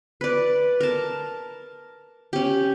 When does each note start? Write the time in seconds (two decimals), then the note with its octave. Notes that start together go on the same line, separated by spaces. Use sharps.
0.21 B4 D5
0.80 A#4 A5
2.33 C#4 G4